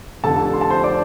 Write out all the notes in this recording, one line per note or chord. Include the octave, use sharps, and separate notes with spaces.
F1 F2 D3 A4 A5
C6
A5
C5 C6
D5 D6